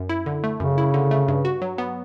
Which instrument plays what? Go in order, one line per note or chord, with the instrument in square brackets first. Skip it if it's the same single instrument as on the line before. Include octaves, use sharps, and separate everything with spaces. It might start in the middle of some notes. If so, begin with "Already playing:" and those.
Already playing: [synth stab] F#2
E4
D3
A3
[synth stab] F#2 [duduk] C#3
[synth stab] E4
D3
A3
G2
F#4
F#3
B3